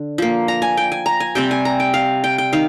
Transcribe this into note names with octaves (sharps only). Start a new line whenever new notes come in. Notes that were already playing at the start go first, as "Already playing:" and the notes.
Already playing: D3
F3 A#3
A#5
G#5
G5
G#5
A#5
G#5
C3 G3 C4 G5
G#5
A#5
G5
F5
G5
G5
D#3 F5